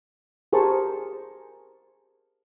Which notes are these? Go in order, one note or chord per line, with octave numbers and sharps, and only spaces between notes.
G4 G#4 A#4 C5 A5 C#6